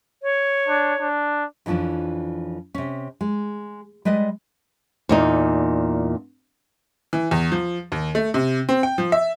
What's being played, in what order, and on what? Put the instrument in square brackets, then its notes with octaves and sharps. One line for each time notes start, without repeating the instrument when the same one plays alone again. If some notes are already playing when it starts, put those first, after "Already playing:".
[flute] C#5
[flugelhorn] D4
D4
[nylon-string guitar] F2 E3 F3 C#4 D4
C3 C#4
G#3
G3 G#3 B4 D5 D#5
E2 A#2 D#4
[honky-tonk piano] E3
E2
F3
D#2
A3
C3
C4
G5
F3
E5